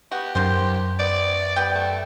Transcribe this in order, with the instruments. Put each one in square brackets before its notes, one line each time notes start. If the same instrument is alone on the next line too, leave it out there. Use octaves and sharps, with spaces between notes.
[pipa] B3 F#4 [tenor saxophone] G4
[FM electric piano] F#2 [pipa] D#3 G3 C5
[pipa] B3 [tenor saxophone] D5
[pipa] B3 G4 G5
[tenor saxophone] A3